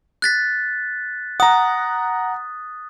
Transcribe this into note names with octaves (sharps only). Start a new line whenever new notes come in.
F#6 A6 B6
F#5 A#5 D#6